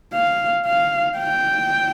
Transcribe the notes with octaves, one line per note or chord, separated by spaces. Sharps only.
F5
F5
G5